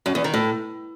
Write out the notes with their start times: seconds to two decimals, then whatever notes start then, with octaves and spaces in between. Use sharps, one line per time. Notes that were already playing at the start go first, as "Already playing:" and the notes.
0.06 F#2
0.15 E2
0.24 D#3
0.34 A2